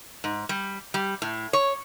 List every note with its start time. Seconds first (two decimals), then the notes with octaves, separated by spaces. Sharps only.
0.24 G#2
0.49 G3
0.94 G3
1.22 A2
1.53 C#5